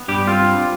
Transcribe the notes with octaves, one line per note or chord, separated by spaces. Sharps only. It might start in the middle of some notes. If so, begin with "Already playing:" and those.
Already playing: B3
G2 G3 G4
C4 F4
G3